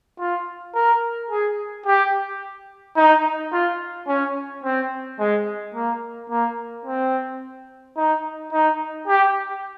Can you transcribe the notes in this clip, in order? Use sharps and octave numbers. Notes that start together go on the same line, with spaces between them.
F4
A#4
G#4
G4
D#4
F4
C#4
C4
G#3
A#3
A#3
C4
D#4
D#4
G4